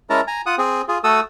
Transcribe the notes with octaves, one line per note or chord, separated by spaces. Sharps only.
G#3 C#4 E4 A#4 A5 A#5
G#5 A#5
F4 F#5 D#6
C4 G#4
F4 G#4
A3 F#4 A4 D#6 E6